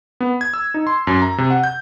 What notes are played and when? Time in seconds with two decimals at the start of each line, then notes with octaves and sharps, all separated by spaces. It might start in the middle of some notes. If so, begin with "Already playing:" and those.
0.21 B3
0.41 G#6
0.54 E6
0.74 D#4
0.87 C6
1.07 F#2
1.21 A#5
1.38 C3
1.50 F#5
1.64 G6